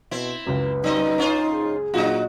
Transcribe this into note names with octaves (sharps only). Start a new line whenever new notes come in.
B2 C4 E4
C#2 F#2 B4
F#3 C4 D#4 D#5
C#4 F4 C5
G#4
A#2 F#3 D4 D#4 F4 F#4